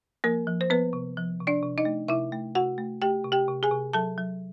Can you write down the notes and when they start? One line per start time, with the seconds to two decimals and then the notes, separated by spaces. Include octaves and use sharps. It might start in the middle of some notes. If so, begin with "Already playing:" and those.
0.24 F3 A#3 A#4
0.47 F3
0.61 C5
0.70 F3 B3 B4
0.93 C3
1.17 F3
1.40 C3
1.47 D4 D5
1.63 C3
1.78 D#4 D#5
1.85 A3
2.08 C3 E4 E5
2.32 A3
2.55 C3 F#4 F#5
2.78 A3
3.02 A3 G4 G5
3.24 C3
3.32 G4 G5
3.48 C3
3.63 G#4 G#5
3.71 C3
3.93 F#3 A4 A5
4.18 F#3